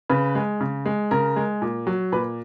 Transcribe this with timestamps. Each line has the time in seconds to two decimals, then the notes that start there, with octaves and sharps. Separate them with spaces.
0.09 C#3 B4
0.35 G#3
0.61 C#3
0.86 G#3
1.11 C#3 A#4
1.36 G#3
1.62 A#2
1.87 F#3
2.12 A#2 B4